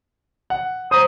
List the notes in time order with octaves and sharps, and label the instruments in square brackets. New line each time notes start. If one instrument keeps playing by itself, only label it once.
[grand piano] F#5
[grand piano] C5 A#5 [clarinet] D#6